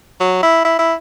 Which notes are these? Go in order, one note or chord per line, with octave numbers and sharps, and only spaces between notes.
F#3
E4
E4
E4